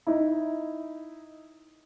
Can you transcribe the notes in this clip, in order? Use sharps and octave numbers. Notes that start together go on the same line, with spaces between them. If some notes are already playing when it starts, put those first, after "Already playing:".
D#4 E4